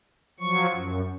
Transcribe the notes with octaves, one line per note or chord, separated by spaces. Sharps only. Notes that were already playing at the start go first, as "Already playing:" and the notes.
F3 F#3 C#6
F#2